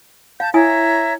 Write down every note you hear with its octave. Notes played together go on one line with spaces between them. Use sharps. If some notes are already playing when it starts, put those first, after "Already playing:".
F5 A5 G6
E4 C#5 E5 G#5 A#5 D#6